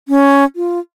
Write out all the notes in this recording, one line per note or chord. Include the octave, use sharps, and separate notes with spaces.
C#4
F4